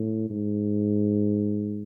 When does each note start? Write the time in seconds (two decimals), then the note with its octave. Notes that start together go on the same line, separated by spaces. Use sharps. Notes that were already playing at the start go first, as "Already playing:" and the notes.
Already playing: A2
0.30 G#2